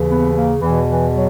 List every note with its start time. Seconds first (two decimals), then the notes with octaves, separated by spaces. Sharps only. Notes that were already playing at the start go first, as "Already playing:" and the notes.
Already playing: D#2 C#3 E3
0.09 B3
0.34 A#3
0.61 E2 B2 E3
0.87 E3
1.13 F#3